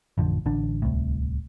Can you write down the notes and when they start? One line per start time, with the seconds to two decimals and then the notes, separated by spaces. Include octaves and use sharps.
0.18 A1 F2 D3 F3
0.46 A1 D3 D4
0.82 D1 C2 A2